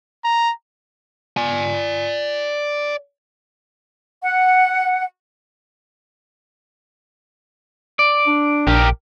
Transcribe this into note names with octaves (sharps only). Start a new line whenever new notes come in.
A#5
D5 G#5
F#5
D5
D4
A#1 G4 A#4